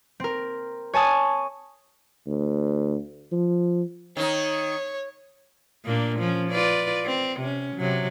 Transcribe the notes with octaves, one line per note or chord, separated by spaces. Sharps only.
C4 A#4
C#5 G#5 A5 D#6
D2
F3
D#3 D#4 C#5
A#2 A#3 D4
F3 C#4
F4 B4 D5
C4
C3 C#4
C3 F#3